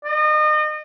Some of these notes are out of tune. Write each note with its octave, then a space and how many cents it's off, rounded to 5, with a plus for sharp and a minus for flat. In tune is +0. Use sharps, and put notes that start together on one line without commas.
D#5 -35